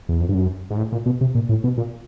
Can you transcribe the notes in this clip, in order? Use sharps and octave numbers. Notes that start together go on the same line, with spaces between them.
E2
F2
G2
F#2
G#2
A2
A#2
B2
C3
A#2
A2
B2
A#2